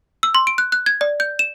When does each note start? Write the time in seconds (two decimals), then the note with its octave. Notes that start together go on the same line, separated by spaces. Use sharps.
0.23 E6
0.35 C6
0.47 D7
0.58 F#6
0.72 F#6
0.86 G#6
1.01 D5
1.20 G6
1.39 E7